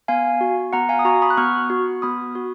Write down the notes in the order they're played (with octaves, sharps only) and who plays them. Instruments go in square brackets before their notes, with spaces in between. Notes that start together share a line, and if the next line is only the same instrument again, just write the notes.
[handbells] B3 F5 G#5
F#4
B3 F#5 A#5
F5 G#5
D#6
F#4 A#5 C#6
B5 D#6
F#6
B3 C#6 F6
F#4
B3 B5 D#6
F#4